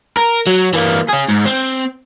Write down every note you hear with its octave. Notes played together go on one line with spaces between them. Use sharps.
A#4
F#3
E3 A#3
C#4 G#4
G#2
C4